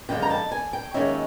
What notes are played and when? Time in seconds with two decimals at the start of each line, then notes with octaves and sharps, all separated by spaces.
0.09 F#2 D3 F3 G#3 G5
0.22 A#5
0.30 A5
0.52 G#5
0.73 G5
0.94 D#2 D#3 G#3 C#4 E5